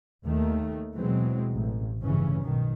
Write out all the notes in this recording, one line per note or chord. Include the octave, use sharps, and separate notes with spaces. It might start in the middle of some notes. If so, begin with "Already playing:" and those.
D#2 D#3 A3
B2 E3 F#3 G#3 C4
A1
F1 G2 C#3 E3 C#4
B1 B2 D#3